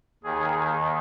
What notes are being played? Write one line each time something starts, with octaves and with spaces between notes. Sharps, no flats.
D#2 D#3 G#4